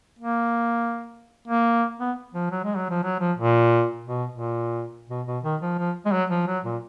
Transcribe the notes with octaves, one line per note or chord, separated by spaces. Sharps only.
A#3
A#3
B3
F3
F#3
G#3
F#3
F3
F#3
F3
A#2
B2
A#2
B2
B2
D#3
F3
F3
G#3
F#3
F3
F#3
A#2